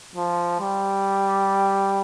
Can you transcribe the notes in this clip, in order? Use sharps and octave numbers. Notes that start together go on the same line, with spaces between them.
F3
G3